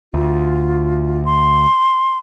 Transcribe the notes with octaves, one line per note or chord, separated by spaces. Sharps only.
D2 F4
C6